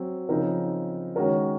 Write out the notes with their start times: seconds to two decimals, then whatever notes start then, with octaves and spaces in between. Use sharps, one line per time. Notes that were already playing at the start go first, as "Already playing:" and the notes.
Already playing: F#3 C4
0.29 C#3 F3 C4 D#4 A#4
1.16 D#3 G#3 C#4 F#4 A#4